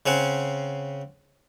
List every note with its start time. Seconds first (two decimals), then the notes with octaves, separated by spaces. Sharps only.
0.06 C#3 C4 C#4 F#5